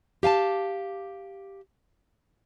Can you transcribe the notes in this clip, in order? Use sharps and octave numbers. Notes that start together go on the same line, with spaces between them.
G4 F5 G#5 A5